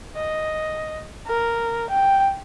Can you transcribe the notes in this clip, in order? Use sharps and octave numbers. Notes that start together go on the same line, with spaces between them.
D#5
A#4
G5